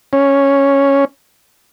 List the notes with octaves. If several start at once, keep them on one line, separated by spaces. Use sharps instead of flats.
C#4